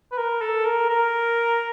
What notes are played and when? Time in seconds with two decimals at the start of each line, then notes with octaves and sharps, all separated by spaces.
0.12 B4
0.17 A#4
0.41 A4
0.65 A#4
0.90 A#4